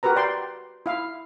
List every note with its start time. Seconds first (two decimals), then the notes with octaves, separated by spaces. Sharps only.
0.03 F#4 G4 A#4 B4 A#5
0.16 D5 G5 C6
0.86 E4 F5